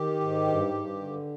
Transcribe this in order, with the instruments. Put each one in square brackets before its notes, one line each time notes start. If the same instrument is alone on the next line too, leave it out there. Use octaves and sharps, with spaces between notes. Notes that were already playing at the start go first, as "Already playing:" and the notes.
Already playing: [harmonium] D#3 G4
G#2
G2
G2
D3